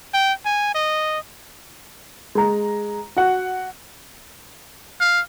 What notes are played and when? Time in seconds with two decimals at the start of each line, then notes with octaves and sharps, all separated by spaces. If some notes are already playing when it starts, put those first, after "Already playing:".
0.14 G5
0.45 G#5
0.75 D#5
2.35 G#3 A#5
3.16 F#4 F#5
5.00 F5